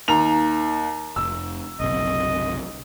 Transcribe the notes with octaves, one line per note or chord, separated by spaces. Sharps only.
D#2 A#5 F7
F1 E6
F#1 B1 C3 D#5